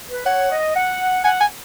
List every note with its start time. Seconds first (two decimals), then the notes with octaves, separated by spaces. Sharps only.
0.10 B4
0.26 C#5 F#5
0.51 D#5
0.76 F#5
1.24 F#5 G#5
1.40 G#5